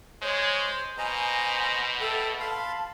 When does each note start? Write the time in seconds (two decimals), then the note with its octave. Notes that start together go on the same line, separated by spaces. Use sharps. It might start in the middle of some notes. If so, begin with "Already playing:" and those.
0.22 G#3 C5 C#5
0.98 B2 C5 D#5 G#5 A#5
2.01 A4 E5 G5
2.40 F5 A5 B5 C6